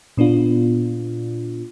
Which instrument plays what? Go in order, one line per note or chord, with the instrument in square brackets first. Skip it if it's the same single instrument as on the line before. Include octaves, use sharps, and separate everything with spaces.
[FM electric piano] A#2 B3 D4 F4